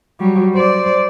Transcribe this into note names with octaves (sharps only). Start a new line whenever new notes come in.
F#3 G3
C5 D5